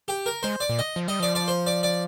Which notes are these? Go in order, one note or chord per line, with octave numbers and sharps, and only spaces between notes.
G4
A#4
G#3 C5
D5
A#2
D#5
F3
G3 D#5
F3 D5
D5
C5
D5
D5